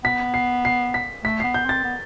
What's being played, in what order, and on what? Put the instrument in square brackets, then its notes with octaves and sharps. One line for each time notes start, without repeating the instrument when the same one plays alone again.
[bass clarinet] B3 [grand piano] B6
[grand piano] C7
C7
B6
[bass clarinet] A3 [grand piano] B6
[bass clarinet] B3 [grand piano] C7
[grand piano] G6
[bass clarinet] C4 [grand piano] A6
[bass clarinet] B3